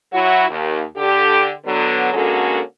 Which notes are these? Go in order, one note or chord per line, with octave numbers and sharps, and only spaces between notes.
F#3 E4 F#4
D#2
D3 G4
D3 F#3 B3
D3 G#3 A#3 C#4 F#4 A4